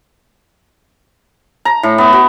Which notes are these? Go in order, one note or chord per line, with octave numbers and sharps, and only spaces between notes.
A#5
A2
B3
F#4